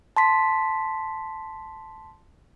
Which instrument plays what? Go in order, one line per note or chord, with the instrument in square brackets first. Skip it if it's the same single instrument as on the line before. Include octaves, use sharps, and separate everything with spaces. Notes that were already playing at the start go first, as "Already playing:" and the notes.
[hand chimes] A5 C6 B6